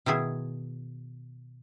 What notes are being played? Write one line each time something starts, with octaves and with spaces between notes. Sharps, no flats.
B2 D#3 E4 G#4